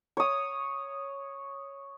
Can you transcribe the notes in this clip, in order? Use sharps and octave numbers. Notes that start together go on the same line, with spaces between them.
C#5 D#6